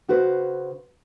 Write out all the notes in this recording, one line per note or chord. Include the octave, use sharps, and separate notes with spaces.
C#3 F#4 B4 C5